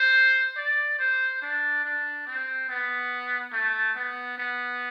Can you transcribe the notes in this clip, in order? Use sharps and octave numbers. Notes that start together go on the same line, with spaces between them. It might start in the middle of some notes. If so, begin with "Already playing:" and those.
Already playing: C5
D5
C5
D4
D4
C4
B3
A3
B3
B3